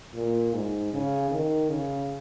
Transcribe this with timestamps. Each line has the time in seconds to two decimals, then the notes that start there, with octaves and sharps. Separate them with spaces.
0.14 A#2
0.54 G#2
0.93 C#3
1.31 D#3
1.70 C#3